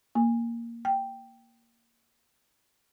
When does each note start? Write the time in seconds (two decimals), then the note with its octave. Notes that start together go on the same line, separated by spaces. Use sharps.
0.15 A#3
0.85 G5